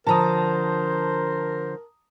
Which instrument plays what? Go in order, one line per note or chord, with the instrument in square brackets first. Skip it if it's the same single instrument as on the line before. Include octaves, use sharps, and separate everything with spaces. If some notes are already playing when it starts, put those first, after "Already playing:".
[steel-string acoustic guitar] D3 F3 [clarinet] A#4 [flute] C5 [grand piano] A5 A#5 D#6